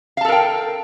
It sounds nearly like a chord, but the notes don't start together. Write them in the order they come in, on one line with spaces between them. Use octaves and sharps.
F5 A5 A4 A#4 G5